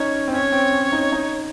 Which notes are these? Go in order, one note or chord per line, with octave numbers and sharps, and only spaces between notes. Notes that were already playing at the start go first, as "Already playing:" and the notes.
Already playing: C#4 D#4 C#5
C4
C#4 C#5
C4
C#4
D#4
D#4